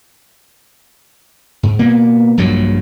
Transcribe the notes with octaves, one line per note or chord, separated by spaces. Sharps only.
G#2
B2 A#3 B3
A#1 G2 A#2 F#3